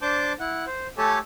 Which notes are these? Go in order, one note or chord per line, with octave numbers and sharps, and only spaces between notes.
D4 C5 A5 D6 G6
E4 F#5
C5
A3 G4 A4 C#5 G#5 A5